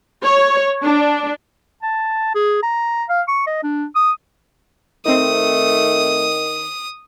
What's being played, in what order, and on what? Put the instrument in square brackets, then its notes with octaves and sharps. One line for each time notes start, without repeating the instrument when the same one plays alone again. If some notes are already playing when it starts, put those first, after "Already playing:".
[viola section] C#5
D4
[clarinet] A5
G#4
A#5
F5
C#6
D#5
D4
D#6
[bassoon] D#3 [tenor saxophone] A3 [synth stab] C4 D#4 [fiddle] D#6